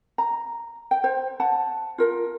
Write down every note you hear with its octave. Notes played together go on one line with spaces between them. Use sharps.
A#5
G5
C5
F#5 A5
F4 A#4